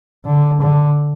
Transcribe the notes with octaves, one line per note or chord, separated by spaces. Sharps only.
D3
D3